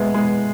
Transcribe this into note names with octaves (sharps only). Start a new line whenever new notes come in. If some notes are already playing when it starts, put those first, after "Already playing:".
Already playing: G#3 A3 B3
G#3 B3